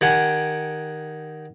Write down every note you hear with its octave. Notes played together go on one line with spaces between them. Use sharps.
D#3 G4 F#5 G#5